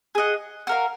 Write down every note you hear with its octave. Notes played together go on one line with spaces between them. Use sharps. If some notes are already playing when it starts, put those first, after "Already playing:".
G#4 D#5 F#5
F#4 A#4 F5